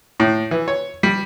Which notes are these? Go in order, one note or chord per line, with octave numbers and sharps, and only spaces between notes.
A2
E3
C#5
G3